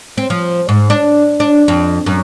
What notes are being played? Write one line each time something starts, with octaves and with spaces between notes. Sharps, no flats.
C4
F3
G#2
D4
D4
F2
F#2